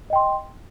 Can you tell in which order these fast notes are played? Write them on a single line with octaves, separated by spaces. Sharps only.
D#5 G5 C6